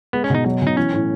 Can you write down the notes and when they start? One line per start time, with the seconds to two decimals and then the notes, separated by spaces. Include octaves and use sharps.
0.13 G#3 B3
0.24 C#4
0.30 B2 D#4
0.46 F#3
0.62 B2
0.67 D#4
0.77 E3 C#4
0.93 A2